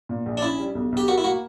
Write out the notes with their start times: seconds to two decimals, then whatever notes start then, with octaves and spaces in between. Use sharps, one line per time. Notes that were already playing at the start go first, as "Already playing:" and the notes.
0.09 A#2
0.26 A#1
0.37 D4
0.42 C#4 E4
0.59 G3
0.75 B1
0.92 B1 G4
1.08 F#4 A#4
1.18 E4
1.24 A#3 F#4